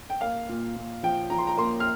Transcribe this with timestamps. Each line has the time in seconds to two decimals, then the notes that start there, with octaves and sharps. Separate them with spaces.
0.10 G5
0.21 A#3 F5
0.49 A#2
0.76 A#2
1.03 F3 G5
1.30 F3 A#5
1.38 C6
1.47 A#5
1.57 A#3 C6
1.80 F6